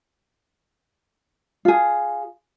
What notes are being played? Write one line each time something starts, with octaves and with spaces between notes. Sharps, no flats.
F4 G#4